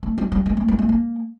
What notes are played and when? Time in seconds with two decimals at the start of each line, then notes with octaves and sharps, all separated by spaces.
0.03 A3
0.18 G3
0.32 G3
0.46 G#3
0.57 A3
0.68 G#3
0.79 A3
0.89 A#3